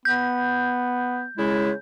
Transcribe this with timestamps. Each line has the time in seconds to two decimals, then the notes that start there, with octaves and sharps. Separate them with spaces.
0.05 B3 G6
1.38 C#3 G#3 E4